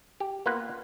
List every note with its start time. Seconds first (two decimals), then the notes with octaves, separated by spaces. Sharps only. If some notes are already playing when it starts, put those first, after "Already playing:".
0.20 G4
0.46 A#3 B3 F4 B4 F5 F#5